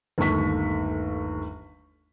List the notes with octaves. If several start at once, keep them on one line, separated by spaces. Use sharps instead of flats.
G1 D#2 A3 C#6 B6